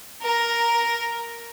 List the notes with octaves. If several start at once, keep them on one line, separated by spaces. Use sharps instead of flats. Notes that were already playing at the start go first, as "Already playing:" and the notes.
A#4 A#5